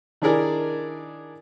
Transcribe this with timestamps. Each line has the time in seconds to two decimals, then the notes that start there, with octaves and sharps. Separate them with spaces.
0.22 D#3 D4 E4 G#4 A#4 D5